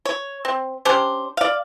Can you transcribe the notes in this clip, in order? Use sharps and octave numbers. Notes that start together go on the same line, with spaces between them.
C#5
C4
C#4 D4 G4 C5
D5 F5